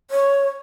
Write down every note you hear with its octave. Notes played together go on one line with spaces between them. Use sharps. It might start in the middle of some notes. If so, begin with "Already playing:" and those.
C#5